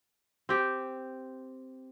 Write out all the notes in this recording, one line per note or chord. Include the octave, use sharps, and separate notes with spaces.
C4 G4